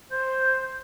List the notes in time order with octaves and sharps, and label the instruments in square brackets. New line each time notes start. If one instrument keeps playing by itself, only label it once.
[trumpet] C5 [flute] G6